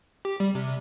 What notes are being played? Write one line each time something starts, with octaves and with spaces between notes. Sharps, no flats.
G4
G3
C3